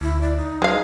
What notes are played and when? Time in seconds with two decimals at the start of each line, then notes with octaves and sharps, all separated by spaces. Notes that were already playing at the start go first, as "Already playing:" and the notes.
0.01 D2 E4
0.21 D5
0.36 D#4
0.62 F#3 G#3 F5